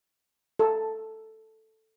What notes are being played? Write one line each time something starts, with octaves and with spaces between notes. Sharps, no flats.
A4